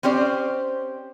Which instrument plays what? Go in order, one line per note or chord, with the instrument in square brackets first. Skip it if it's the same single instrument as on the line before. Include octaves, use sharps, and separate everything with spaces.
[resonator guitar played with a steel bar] C4 C#4 G4 C5 D5